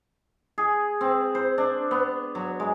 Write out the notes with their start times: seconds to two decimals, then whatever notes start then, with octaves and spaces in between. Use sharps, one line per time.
0.58 G#4
1.01 C4
1.35 C5
1.58 D4
1.91 B3
2.35 F#3
2.60 G#3